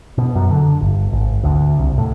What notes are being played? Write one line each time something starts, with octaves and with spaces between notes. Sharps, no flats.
B2
F#2
D3
G1
G#1
D2
C2
A2